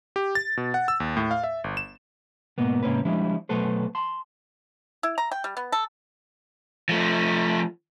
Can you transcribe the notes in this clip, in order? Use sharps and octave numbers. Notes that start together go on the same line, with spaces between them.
G4
A6
B2
F#5
E6
D#2
A2
F5
E5
G1
E7
G#2 B2 A#3 B3
G#2 C3 A#3 C4 C#4 B4
F3 G3 G#3 D4 E4
B2 F#3 A3 A4 B4 C5
A5 C6
E4
A#5
G5
G3
B3
A4
F3 A3